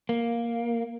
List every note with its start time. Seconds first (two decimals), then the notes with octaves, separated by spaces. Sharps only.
0.09 A#3